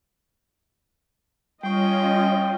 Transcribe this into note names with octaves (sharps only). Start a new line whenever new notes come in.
G3 C#4 F4 D#5 G5 C#6